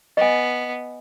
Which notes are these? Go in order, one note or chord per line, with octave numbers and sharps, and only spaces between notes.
B3 D#5 G#5